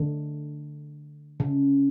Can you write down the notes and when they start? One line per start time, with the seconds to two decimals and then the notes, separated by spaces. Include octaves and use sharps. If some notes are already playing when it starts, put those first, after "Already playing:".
Already playing: D3
1.40 C#3